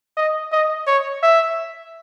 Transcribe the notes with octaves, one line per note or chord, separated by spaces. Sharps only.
D#5
D#5
C#5
E5